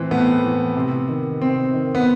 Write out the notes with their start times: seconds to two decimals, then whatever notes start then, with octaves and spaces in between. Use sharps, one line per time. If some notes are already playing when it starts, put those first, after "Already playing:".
Already playing: A2 E3 C4
0.11 A2 B3
0.43 E3
0.76 C3
1.08 D#3
1.41 C3 C4
1.73 D#3
1.95 B3